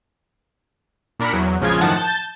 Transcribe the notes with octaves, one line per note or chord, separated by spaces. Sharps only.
A#2 D4 A#4 B5 C#7
E2 F#3
A#1 C#3 F3 G#3 F4 G#6
F#2 A2 D#3 F3 F#5 A5
A5 G6 A6